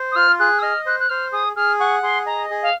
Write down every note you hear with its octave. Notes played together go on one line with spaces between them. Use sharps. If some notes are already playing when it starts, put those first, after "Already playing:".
Already playing: C5
D#6
F4 F6
G#4 F#6
D#6
D#5 F6
C5 F#6
F#6
C5 F6
G#4 D#6
G#4 F6
F#5 C#6
G#4 C6
D#5 A#5
G#4
F5